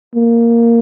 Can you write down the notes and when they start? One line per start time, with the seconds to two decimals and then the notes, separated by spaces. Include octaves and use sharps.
0.16 A#3